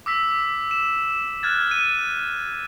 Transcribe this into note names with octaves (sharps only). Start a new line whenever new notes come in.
D6 E6 B6
E7
F6 F#6 G#6 A6
D#7